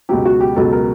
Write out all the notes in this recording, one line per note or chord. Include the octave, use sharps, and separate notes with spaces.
C#2 B2 F#3 G4
F#4
G4
C#2 B2 F#3 A4
A#4